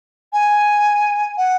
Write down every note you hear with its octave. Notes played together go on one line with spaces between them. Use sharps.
G#5
F#5